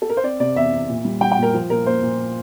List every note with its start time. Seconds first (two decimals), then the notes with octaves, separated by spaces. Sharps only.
0.02 A4
0.10 A#4
0.17 C5
0.24 C4 D5
0.40 C3 D5
0.56 E2 E5
0.72 E2
0.89 A#2
1.05 G3
1.21 G3 G5
1.32 G5
1.37 A#2
1.43 A#4
1.54 F3
1.70 A#2 A#4
1.86 A#3 C5
2.02 A#2